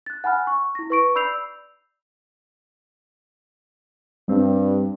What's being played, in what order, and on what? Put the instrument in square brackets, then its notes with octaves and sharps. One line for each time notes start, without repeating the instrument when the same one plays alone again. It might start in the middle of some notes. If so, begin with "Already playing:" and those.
[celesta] F#6 A6
F#5 G#5 B5 F6 F#6
C#6
E4 A#6
B4 C#6 D7
D5 B5 E6 G6 C7 F7
[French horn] G2 [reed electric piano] G3 C4